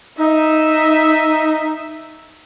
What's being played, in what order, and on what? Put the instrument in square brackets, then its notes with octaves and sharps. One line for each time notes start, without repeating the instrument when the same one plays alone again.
[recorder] D#4 [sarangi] E5